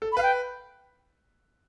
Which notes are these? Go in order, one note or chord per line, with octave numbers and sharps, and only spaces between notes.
A4
B5
B4 F5
G5